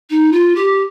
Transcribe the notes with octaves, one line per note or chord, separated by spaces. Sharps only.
D#4
F4
G4